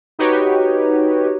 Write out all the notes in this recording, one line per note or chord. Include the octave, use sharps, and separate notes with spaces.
D#4 F#4 G4 B4 C#5